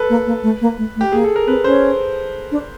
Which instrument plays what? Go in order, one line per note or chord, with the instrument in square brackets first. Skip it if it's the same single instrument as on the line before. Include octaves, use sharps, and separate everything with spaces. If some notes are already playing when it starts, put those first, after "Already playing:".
Already playing: [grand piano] A4 B4
[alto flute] A#3
A#3
A3
A#3
A3
A3
[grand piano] G4
[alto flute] A#3 [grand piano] G#4
[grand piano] A4
A#4
[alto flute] C4 [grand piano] B4
[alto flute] C#4 [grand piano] C5
[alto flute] D4